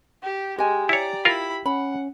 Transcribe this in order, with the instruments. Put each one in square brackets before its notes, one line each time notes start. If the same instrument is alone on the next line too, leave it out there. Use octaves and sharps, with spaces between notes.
[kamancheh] G4
[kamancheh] G#3 [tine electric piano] G4 G5 [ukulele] D#5 G#5
[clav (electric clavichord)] E4 C#5 [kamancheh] D5 A#5
[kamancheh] E4 B5 [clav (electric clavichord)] F4 A#4
[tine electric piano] C#4 [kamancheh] F#5 [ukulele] B5